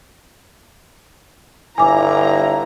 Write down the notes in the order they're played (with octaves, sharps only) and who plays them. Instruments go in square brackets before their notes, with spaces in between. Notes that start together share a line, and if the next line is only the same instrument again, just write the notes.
[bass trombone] G1 [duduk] E4 [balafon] G#5 D6 [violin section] A#5